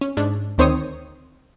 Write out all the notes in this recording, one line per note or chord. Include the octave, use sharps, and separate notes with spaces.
C#4
G#2 D4
D2 D#3 C4 C5 C#5 D#6